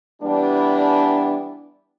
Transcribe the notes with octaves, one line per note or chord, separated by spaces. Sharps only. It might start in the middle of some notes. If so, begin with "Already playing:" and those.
E3 G3 B3 D4